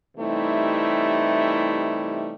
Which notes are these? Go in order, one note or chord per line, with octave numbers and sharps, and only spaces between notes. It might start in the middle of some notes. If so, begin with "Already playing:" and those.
C3 E3 G3 A3 D#4 E4